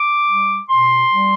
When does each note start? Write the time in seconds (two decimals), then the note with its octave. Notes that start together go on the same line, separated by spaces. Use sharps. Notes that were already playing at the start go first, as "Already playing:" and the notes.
Already playing: D6
0.27 G3
0.69 B2 C6
1.10 G3